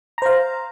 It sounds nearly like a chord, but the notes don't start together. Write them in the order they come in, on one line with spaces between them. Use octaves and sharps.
A#5 C5 F5